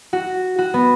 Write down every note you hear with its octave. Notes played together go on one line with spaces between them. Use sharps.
F#4
F#4
B3